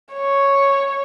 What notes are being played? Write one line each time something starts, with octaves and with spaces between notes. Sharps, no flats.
C#5